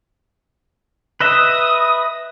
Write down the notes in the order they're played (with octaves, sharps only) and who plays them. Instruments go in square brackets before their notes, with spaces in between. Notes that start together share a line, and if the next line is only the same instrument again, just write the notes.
[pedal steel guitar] B4 D#5 E5 [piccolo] D#6